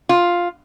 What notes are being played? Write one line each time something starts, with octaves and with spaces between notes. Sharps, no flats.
F4